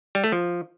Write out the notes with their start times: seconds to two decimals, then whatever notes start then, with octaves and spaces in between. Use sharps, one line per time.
0.15 G3
0.24 A3
0.32 F3